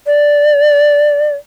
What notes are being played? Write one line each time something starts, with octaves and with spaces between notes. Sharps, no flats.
D5